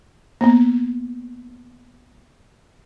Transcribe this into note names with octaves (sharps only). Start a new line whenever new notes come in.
A#3 B3